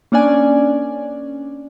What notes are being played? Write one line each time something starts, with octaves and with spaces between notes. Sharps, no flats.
A#3 C#4 D4 D5 G#5